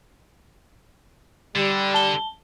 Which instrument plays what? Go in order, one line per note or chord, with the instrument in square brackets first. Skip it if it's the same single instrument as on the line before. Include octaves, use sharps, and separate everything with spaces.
[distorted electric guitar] D3 [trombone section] G3
[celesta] A5 G7